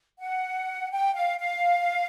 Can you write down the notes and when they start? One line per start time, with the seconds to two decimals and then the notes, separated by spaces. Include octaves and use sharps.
0.20 F#5
0.91 G5
1.14 F5
1.39 F5